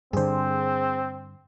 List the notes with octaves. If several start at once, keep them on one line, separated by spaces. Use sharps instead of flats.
G2 D3 C4 G#4 C5